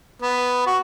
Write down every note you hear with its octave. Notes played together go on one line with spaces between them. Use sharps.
B3
F#4